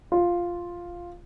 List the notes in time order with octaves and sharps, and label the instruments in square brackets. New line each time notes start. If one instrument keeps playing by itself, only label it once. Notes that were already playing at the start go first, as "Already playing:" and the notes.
[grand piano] F4